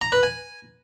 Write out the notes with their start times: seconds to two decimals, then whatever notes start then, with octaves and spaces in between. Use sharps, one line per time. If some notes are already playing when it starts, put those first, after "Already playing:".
0.01 A#5
0.12 B4
0.23 G#5